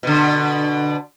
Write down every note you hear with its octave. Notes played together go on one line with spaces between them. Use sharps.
B2 D3